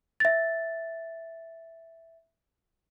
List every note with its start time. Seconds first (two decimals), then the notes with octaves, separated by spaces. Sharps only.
0.20 E5 A6